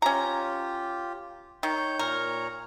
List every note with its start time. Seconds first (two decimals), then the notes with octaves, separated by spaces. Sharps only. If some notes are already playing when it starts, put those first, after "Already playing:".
0.02 C#4 F4 G4 A#5
1.63 D#3 C#5 G6
1.99 A#2 A#4 C#5 A#5